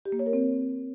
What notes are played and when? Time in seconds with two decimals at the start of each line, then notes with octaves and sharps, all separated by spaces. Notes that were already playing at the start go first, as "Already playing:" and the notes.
0.05 G4
0.12 A#3
0.19 C#5
0.26 A#4
0.33 C4